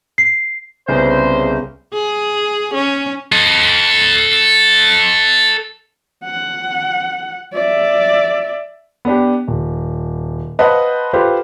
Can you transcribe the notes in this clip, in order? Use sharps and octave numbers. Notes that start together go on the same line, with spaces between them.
C7
C2 C#3 B3 C5
G#4
C#4
A4 D#5
F#5
D5 E5
B3 D4 G4
D#1
B4 C5 D#5 F5 F#5 A5
F4 G4 A4 B4 C5 F5